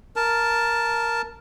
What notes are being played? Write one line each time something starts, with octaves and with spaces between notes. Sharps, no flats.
A#4 A5